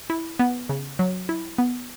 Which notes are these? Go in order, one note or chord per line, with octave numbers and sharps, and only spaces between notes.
E4
B3
C#3
F#3
E4
B3